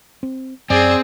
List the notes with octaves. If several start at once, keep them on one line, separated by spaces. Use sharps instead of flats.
C4
F#2 C4 G#4 D5